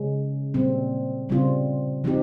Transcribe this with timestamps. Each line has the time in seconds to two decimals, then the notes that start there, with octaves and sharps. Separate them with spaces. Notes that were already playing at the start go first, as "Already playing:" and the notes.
Already playing: C#3 G#3 C#4
0.54 A#2 G3 C4
1.29 C#3 G3 C4 F4
2.04 F3 C4 D#4 G4